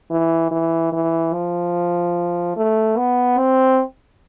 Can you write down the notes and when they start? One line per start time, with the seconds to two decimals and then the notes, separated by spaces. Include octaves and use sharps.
0.10 E3
0.51 E3
0.92 E3
1.33 F3
2.56 A3
2.97 B3
3.38 C4